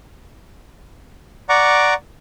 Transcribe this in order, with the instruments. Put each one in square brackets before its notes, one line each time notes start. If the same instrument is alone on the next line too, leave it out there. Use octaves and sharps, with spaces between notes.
[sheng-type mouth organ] D5 F#5 A#5 C#6 D6